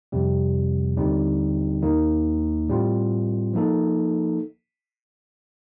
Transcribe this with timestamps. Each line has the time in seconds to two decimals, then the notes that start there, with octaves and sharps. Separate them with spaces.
0.12 F2 C3 G3
0.97 D#2 D3 G3 C4 D#4
1.83 D#2 D#3 A#3 D#4
2.68 A2 G3 C4 F4
3.53 F3 A#3 D#4 A4